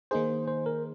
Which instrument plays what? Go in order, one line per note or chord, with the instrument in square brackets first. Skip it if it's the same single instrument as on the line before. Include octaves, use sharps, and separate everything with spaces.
[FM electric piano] D#3 A#3 D#4 G#4 [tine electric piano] C5
[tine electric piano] C5
A#4